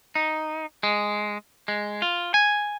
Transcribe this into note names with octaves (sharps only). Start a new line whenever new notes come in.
D#4
G#3
G#3
F4
G#5